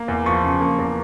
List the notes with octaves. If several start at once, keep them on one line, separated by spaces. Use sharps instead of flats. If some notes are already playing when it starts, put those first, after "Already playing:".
Already playing: A#3
E2
F3 C#6
C#3
A#3
E2